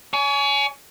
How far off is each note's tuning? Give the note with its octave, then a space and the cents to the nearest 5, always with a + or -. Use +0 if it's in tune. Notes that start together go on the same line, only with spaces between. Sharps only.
C#5 +35 G#5 +20